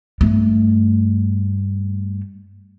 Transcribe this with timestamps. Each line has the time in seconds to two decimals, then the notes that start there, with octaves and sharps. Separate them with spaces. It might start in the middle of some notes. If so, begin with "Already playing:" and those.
0.21 G2 A3